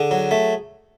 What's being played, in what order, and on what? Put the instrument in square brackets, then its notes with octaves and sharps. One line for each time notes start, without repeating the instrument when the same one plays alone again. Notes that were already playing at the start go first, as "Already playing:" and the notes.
Already playing: [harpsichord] D3 G#4
F#3
A3